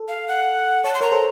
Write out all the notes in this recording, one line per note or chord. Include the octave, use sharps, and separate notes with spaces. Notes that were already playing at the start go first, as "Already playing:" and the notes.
Already playing: A4
F5
F#5
C#5 A5
C6
A#4 C#5 A#5
A4 C5